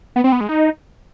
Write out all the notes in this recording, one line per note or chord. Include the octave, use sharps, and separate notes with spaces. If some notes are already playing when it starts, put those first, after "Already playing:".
B3
C4
B3
G#3
D#4